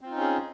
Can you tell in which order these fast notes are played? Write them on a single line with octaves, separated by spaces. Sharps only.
C4 F4 D#4 C#4 G#4